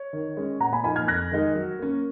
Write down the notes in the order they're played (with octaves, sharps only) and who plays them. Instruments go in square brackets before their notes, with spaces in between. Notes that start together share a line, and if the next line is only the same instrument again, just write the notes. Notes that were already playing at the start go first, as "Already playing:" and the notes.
Already playing: [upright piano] C#5
[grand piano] D#3
G#3 C#4
[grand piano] A#2 [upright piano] F#5 A#5
[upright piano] G#5 B5
[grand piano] F3 A#3 D#4 A#4 [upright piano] G#5 B5
[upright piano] F6 G#6
[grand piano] F2 [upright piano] F#6 A#6
[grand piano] D#3 G#3 D#4 G#4
F#3
A#3 C#4